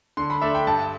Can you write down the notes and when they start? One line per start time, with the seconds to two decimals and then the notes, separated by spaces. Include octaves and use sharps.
0.17 D3 C6
0.30 B5
0.41 A3 D4 E5
0.55 G5
0.67 G2 A5